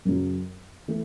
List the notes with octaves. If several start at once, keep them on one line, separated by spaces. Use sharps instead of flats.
F#2 C#3 F#3
E3 A3